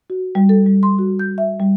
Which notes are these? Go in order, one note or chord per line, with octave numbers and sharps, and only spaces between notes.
F#4
G3
A4
G3
C6
F#4
G6
E5
G3